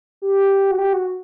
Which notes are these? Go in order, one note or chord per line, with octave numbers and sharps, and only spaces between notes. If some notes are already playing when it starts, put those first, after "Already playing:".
G4
F#4
G4
F#4